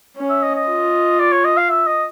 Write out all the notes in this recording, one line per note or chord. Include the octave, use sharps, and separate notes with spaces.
C#4
E5
D#5
D#5
F4
D5
C#5
D#5
F5
E5
D#5